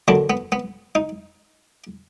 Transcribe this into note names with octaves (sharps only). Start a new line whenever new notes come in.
D#2 D3 F#3 D4
B3
B3
D#4